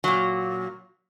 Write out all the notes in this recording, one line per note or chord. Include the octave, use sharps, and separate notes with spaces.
A#2 F#3